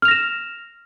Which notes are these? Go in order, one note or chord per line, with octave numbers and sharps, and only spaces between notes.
F6 A#6 E7 F7